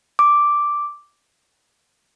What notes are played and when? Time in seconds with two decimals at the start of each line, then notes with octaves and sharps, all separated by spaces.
0.19 D6